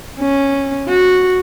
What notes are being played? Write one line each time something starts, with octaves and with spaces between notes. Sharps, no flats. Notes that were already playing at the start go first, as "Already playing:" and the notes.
C#4
F#4